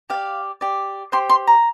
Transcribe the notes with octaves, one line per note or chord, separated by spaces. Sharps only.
G4 D5 F5
G4 D5
G4 C5 C6
C6
A#5